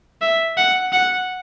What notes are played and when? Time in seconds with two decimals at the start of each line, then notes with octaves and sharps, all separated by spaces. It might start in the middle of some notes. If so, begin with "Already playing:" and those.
0.22 E5
0.57 F#5
0.92 F#5